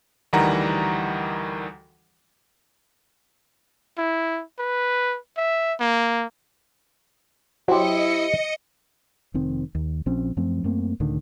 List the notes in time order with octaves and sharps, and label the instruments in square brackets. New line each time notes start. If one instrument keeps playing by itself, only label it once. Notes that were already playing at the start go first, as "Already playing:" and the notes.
[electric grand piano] D2 D#3 E3 G3 F#5 A#5
[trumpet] E4
B4
E5
A#3
[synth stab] F#3 [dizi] E4 [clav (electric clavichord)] G4 C5 [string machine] D#5 C#7
[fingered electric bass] F1 D#3 C4
D#2
A#1 F3 C4 C#4
F#2 F3 A3 C4
F#2 A3 A#3 C4
C#2 A2 D3 D#3